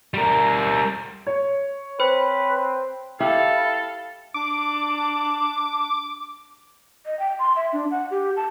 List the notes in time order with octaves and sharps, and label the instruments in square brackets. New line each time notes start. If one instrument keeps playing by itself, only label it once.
[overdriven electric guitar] G3 A#4
[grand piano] C#5
[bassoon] C4 [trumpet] B4 [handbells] C5
[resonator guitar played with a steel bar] E4 [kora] G4 [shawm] A4 [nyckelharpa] F5
[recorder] D4 [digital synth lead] D6
[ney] D#5
G5
C6
E5
D4
F#5
G4
A5